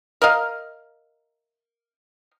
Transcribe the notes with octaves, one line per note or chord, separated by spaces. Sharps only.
A#4 D#5 F5